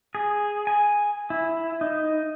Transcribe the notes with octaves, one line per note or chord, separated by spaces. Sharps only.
G#4
G#5
E4
D#4